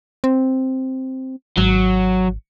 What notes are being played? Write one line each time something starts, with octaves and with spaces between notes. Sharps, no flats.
C4
G#1 F#3